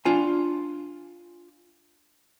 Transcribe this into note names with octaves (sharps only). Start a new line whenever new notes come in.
D4 F4 G#5